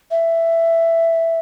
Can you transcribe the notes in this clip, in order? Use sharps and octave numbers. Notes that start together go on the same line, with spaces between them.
E5